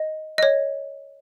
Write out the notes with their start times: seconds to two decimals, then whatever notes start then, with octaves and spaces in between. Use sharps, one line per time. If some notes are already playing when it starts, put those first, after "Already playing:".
Already playing: D#5
0.38 D#5
0.43 C#5